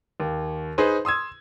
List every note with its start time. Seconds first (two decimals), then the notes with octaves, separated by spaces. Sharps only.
0.20 D#2
0.78 D#4 G#4 B4 C5
1.05 C6 D#6 E6 G#6